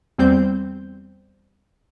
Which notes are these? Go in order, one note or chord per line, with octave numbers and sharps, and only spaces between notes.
E2 G3 C4 C5 G6